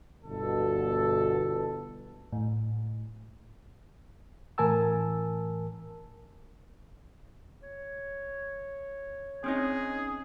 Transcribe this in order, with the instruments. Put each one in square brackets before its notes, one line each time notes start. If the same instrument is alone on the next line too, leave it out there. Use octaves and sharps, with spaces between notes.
[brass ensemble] G1 B2 A4
[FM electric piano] A2
[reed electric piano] A2 E3 A#4 G#5 A5 E6
[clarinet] C#5
[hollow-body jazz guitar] C4 C#4 D#4 [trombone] G#4